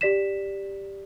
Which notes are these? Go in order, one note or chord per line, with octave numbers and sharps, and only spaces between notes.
G4 D5 B6 E7